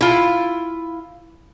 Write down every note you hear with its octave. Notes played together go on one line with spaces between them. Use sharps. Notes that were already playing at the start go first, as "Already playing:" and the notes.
E4 F4